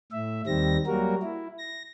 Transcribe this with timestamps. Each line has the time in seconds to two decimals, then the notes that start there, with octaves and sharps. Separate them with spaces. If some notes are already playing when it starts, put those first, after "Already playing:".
0.12 A2 E5
0.47 D#2 D#3 G3 C4 A#6
0.87 F#3 G3 A#3 F#4 A#4
1.22 E4
1.58 A#6